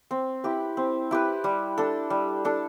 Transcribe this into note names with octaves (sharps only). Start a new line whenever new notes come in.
C4
E4 G4 B4
C4
E4 G4 B4
G3
D4 A4
G3
D4 A4